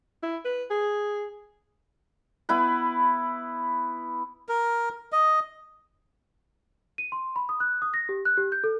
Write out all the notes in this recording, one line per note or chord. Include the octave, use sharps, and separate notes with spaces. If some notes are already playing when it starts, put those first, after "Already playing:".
E4
B4
G#4
B3 E4 B4
A#4
D#5
D#7
C6
B5
D#6
F#6
D#6
A#6
G4
F#6
G4
G6
A4